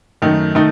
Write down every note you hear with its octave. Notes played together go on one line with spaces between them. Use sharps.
F#2 D#3 A3 D#4
D#3 A3 D#4